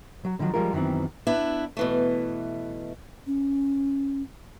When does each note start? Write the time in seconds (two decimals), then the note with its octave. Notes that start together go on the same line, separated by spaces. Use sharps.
0.25 F#3
0.39 D3 D#3 F3 F#3
0.54 F3 G3 G#3 F4 A#4
0.73 F#2 D#3 E3 B3 C4
1.27 B3 D4 E4
1.77 B2 E3 A3
3.27 C#4